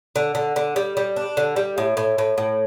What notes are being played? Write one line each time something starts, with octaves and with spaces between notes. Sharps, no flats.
D3
D3
D3
G3
G3
D4
D3
G3
A2
A2
A2
A2